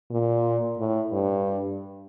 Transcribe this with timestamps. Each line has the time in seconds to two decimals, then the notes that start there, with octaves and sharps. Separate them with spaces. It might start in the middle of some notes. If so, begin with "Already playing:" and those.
0.11 A#2
0.79 A2
1.12 G2